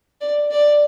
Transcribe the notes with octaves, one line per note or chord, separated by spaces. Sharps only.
D5
D5